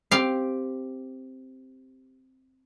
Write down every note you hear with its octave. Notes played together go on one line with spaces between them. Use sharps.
C4 G4 F5